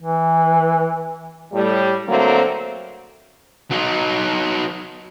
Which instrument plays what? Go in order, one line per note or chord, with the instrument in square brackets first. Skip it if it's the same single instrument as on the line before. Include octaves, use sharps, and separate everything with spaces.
[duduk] E3
[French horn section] A2 G3
D3 F#3 A3 A#3 C4
[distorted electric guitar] F#3 D#4